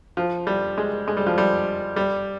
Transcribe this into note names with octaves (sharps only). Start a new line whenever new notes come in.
F3
G3
G#3
G#3
G3
F3
G3
G3